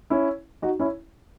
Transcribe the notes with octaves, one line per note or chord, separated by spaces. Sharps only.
C#4 E4
D#4 F#4
C#4 E4